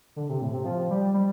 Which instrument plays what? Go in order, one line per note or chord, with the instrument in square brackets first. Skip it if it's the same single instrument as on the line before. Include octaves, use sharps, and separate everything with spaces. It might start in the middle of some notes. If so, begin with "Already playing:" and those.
[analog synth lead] D3
C3
A2
C3
F3
G3
G3